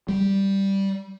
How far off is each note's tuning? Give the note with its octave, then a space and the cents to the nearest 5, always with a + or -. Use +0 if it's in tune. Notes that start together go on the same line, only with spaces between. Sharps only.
G3 -5